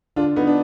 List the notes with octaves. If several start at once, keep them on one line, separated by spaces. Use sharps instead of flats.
D3 D4 F4
D3 B3 D#4
D4